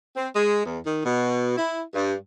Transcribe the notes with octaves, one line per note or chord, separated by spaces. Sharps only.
C4
G#3
E2
D#3
B2
E4
G2